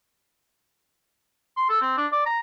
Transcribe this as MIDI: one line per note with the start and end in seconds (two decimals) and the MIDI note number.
1.57 1.69 84
1.69 1.80 69
1.81 1.93 60
1.98 2.07 62
2.12 2.25 74
2.26 2.40 82